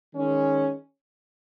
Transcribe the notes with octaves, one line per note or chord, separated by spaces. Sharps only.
D#3 G#3 C#4